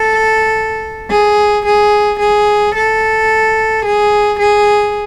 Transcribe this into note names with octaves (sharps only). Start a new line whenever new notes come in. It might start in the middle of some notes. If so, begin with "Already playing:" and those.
Already playing: A4
G#4
G#4
G#4
A4
G#4
G#4